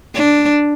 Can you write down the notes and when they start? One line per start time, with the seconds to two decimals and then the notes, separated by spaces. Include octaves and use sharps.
0.15 D4